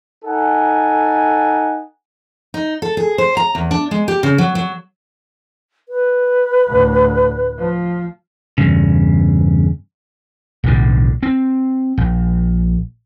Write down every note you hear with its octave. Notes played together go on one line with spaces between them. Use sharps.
D#4 A4 F#5 G#5
D#4
A4
G#4
C5
A#5
E2
D4
G#3
G4
C#3
F#3
F#3
B4
D2 A2
F3
E2 G2 C#3
B1 A2 D3
C4
A#1